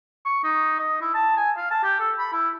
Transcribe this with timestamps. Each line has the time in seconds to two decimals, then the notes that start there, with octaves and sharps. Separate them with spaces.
0.25 C#6
0.44 D#4
0.79 D#5
1.01 E4
1.14 A5
1.37 G#5
1.57 F5
1.71 A5
1.84 G4
2.00 A4
2.19 B5
2.33 E4